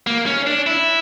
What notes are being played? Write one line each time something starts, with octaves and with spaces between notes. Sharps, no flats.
A#3
C#4
D4
E4